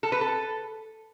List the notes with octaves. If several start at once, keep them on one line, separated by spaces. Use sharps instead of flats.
A4
B4
A4